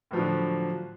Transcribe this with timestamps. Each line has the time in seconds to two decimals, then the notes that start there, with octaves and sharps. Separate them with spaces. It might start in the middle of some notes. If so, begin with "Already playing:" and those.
0.11 A2
0.13 F3
0.16 F#3
0.18 D3